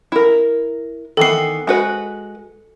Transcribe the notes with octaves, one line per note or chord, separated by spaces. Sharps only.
E4 A#4
D#3 E3 B3 A4 C7
G#3 F#4 B4